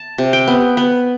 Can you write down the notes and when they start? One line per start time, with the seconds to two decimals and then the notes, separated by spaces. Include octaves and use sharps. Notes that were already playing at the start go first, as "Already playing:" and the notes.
Already playing: A5
0.18 C3
0.33 G5
0.48 B3
0.77 B3